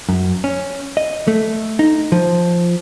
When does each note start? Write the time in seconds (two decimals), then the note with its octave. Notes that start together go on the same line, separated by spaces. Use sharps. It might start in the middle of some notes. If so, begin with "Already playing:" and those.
0.09 F#2
0.44 C#4
0.97 D#5
1.28 A3
1.79 D#4
2.12 F3